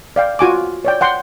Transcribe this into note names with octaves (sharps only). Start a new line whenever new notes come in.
D5 F5 G5
F4 F#4 G#5 D6
C#5 D5 G5
F#5 G5 C6